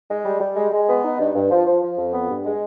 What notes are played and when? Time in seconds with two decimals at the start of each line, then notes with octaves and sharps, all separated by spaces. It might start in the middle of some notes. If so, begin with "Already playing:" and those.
0.10 G#3
0.25 G3
0.41 G3
0.56 G#3
0.72 G#3
0.88 B3
1.04 D#4
1.19 G2
1.35 G2
1.51 F3
1.66 F3
1.82 F3
1.98 F2
2.13 B3
2.30 G2
2.45 G#3